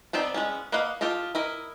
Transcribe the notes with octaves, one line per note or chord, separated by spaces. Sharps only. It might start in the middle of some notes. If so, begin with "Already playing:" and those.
B3 C4 D#4 D5
G#3 B3 C#4
A#3 B4 D#5 F5 F#5
F4 G4 A4 D#5
E4 A#4 D#5